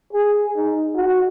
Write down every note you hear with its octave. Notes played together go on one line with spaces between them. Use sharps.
G#4
D#4
F#4